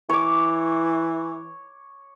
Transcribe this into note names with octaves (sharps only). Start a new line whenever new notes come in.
E3 C#5 D6